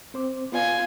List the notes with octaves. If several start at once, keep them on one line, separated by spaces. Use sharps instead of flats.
C4 C5 D6
B3 F4 D5 G#5